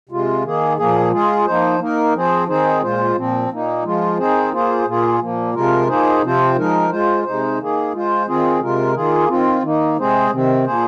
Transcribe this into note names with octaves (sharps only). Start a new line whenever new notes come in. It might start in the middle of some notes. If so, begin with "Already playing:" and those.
C3 G#3 F4
D#3 A#3 G#4
A#2 F3 A#3 G#4
G#3 F4 G#4
F3 A#3 D#4 C5
A#3 D#4 A#4
F3 C4 G#4 C5
D#3 C4 D#4 G#4 C5
A#2 G#3 F4 C5
A#2 F3 C4
A#2 A#3 D#4
F3 G#3 F4
D#3 C4 D#4 G#4 C5
A#3 F4 G#4 C5
A#2 A#3 F4 G#4
A#2 F3 A#3
C3 F3 G#3 F4 A#4
F3 A#3 D#4 G#4 C5
C3 F3 C4 F4 C5
F3 G#3 D#4 A#4
G#3 F4 C5
C3 G#3 D#4 C5
D#3 A#3 G#4
G#3 F4 C5
D#3 C4 F4 G#4
C3 G#3 F4 A#4
D#3 A#3 F4 G#4
D#3 C4 F4
D#3 A#3 D#4
C3 G#3 C4 G#4 C5
C3 D#3 C4
A#2 F3 A#3 G#4 C5